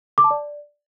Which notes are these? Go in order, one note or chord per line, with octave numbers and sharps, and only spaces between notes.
D6
A5
D5